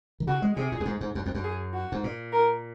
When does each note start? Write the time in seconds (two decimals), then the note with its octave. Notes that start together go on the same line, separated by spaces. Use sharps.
0.20 D#3
0.27 C#3 F#4
0.42 G#3
0.56 C3 G#4
0.72 A#2
0.80 F#2
0.85 G#2
1.01 G#2
1.15 F#2
1.26 F2
1.35 F#2
1.44 G#4
1.74 F#4
1.92 G#2
2.04 A#2
2.33 A#4